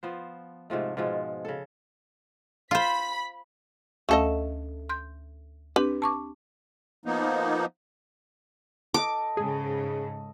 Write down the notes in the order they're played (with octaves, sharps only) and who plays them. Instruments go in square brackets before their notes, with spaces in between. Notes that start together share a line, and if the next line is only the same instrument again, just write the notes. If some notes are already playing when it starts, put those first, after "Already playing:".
[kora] F3 B3 C5
G#2 C3 F3 A3
G#2 B2 F3 G#3
C#3 A4
[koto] F4 C5 [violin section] B5 B6
[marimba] D2 C#4 F5 [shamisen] A3 A4 D#5
[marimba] C6 G6
[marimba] C4 D4 G4 [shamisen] B4
[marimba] A5 C#6 D6
[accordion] F3 A#3 B3 D#4
[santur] A4 D#5 [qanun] D6
[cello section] G#2 C#3 [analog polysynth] G#4